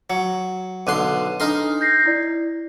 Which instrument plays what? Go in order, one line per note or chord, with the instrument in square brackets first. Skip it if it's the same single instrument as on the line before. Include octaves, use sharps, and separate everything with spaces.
[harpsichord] F#3 [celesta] C#7
[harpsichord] B1 D3 C6 [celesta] F#6 D#7
[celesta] D4 A4 F6 [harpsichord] D#4 A#5 C6
[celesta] G6 A#6 C7
E4 D5